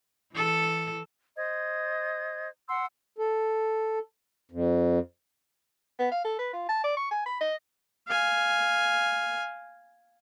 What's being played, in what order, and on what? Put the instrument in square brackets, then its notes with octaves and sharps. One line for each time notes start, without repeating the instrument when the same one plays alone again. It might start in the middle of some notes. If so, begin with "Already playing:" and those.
[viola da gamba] E3 A4
[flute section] C5 D#5 G#6
F#5 C6 E6
[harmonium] A4
F2
[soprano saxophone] B3
F5
A4
B4
F4
A5
D5
C#6
G#5
B5
D#5
[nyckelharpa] F5 G#5